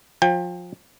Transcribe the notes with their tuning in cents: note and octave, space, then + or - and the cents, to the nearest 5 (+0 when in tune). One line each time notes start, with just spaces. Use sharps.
F3 +25 G5 +30